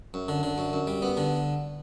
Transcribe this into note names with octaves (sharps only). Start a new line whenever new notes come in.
F#2
D3
D3
F#2
F#2
G3
B3
D3